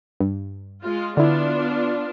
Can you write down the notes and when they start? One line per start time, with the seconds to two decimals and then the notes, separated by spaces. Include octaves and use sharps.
0.20 G2
0.83 G#3 F4
1.17 D3 B3 D4 E4 F4